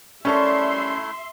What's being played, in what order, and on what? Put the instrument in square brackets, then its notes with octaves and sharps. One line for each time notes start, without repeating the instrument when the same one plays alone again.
[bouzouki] G3 A#4 [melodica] A3 E4 [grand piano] C#4 A4 [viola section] E5 C6